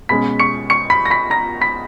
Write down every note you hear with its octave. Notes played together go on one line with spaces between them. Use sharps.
B2 G#3 C#4 B5 B6
C#6 C#7
C#6 C#7
B5 B6
A#6
B5 B6
A#5 A#6
B5 B6